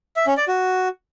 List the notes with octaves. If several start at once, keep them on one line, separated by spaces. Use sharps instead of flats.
E5
C#4
D5
F#4